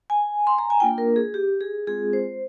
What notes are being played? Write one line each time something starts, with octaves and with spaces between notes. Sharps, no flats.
G#5
C6
A#5
G#5
A#3 D4 F4 G5
A#4
G#4
G4
G#4
G#3 C4 F4 G#4
C5